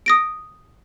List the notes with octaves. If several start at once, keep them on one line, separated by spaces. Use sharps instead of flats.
D#6 A#6 D7